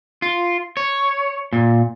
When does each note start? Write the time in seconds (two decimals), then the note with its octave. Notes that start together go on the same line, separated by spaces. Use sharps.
0.22 F4
0.77 C#5
1.53 A#2